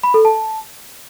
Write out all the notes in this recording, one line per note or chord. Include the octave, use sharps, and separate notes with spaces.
B5
A4
A5